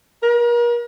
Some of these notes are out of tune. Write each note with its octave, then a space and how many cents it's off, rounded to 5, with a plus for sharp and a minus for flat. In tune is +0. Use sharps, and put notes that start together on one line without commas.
A#4 +40